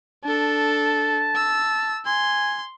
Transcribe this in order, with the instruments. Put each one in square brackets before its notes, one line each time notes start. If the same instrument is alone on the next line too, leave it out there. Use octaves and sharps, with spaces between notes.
[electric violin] D4 A4 [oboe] A5
[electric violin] E6
[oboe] G#5 [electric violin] C6